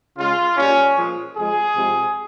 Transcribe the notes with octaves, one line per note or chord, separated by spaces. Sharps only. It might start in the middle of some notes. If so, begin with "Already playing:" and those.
C#3 G#3 F4
A#2 G3 C#4
A#2 F3 G#3
C3 F3 G#3 G#4
C3 F3 G#3